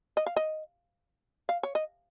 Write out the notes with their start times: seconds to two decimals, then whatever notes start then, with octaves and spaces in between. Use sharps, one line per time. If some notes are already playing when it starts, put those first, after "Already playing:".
0.17 D#5
0.26 F5
0.36 D#5
1.49 F5
1.63 C#5
1.75 D#5